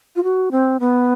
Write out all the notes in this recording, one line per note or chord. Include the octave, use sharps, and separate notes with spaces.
F4
F#4
C4
B3